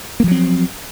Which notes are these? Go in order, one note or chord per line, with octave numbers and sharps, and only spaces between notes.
F3 F#3 A#3 C4